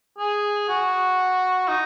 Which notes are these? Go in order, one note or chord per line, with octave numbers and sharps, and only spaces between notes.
G#4
F#4
D#4